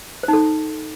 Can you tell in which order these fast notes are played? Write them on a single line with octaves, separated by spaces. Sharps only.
C5 D#4 A4